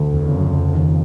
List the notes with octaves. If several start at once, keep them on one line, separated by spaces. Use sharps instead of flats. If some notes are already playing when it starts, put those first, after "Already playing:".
Already playing: D2
E2
C#3
F#2
F2
D#2